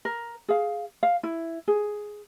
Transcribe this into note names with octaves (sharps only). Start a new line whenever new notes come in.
A#4
G#4 F5
F5
E4
G#4